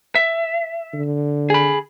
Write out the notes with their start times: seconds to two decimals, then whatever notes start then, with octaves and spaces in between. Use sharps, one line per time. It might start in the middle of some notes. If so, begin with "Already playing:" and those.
0.15 E5
0.94 D3
1.50 G#4 B5